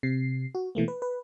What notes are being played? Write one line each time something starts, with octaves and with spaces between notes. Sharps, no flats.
C3 C7
F#4
B2 E3 A3 A#3
B4
B4